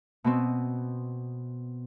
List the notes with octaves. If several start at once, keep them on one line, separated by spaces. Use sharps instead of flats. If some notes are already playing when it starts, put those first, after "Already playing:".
B2 B3 C4